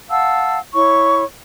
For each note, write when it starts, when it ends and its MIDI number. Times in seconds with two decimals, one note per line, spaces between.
0.10 0.58 77
0.10 0.58 78
0.10 0.58 81
0.10 0.58 88
0.74 1.23 64
0.74 1.23 73
0.74 1.23 85